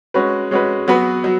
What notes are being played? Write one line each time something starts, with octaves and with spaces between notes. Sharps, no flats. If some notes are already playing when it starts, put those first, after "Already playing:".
G#3 C#4 F#4 B4
G#3 C#4 F#4 B4
F#3 B3 F#4 B4
F#3